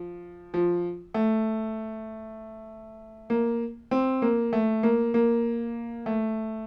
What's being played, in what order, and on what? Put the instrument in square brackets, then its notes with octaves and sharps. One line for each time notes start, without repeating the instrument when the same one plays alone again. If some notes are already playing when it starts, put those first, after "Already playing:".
Already playing: [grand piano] F3
F3
A3
A#3
C4
A#3
A3
A#3
A#3
A3